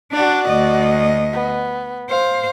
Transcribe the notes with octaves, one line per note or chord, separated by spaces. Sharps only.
D4 F#4 D5
D2 D#5
B3
C5 F5